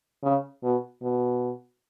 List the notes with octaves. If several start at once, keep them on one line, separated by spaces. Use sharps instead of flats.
C#3
B2
B2